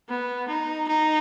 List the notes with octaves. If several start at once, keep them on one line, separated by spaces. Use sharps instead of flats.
B3
D#4
D#4